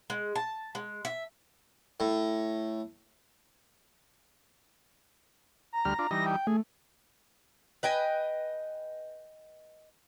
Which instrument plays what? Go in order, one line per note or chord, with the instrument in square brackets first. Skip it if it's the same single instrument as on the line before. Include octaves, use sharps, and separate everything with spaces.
[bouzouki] G#3
A5
G#3
E5
[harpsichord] A2
[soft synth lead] A#5
[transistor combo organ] D2 G3 F6
D4 F4
[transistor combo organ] E3 G3 D#4 [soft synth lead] A#6
[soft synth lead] G5
[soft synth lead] A3 [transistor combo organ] G#4
[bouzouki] B4 D#5 G5 G#5